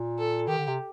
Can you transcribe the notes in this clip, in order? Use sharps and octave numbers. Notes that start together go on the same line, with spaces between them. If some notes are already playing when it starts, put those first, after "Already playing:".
Already playing: A#2
A4
D#3 G4
D3
C3